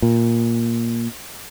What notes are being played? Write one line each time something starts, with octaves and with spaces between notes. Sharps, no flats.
A#2